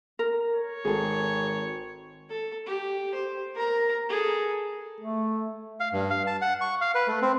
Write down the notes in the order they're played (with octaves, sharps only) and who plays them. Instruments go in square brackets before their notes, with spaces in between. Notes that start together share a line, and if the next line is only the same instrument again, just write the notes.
[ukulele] A#4
[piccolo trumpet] C#5
[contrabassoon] G#1 [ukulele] G#4 A4
[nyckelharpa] A4
G4
C5
A#4 A#5
G#4 A4
[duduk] A3
[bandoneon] F5
G2
F5
A5
F#5
C#6
F5
B4
A3
C4